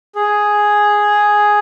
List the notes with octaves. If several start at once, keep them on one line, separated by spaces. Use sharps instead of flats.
G#4